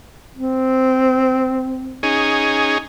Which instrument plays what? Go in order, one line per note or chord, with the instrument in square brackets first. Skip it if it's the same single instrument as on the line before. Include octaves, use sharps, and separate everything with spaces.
[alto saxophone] C4
[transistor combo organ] C#4 D#4 G#4